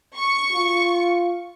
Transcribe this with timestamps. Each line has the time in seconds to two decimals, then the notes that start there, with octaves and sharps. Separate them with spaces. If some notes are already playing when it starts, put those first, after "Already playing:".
0.15 C#6
0.52 F4